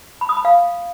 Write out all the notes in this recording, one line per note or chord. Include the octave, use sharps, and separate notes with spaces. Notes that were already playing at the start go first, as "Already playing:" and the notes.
B5
D#6
B5
F5